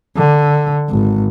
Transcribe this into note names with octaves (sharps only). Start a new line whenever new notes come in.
D3
G#1